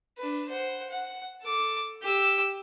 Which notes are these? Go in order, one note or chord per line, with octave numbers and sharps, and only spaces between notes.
D4 B4
C5 F#5
F#5
A4 D6
G4 E6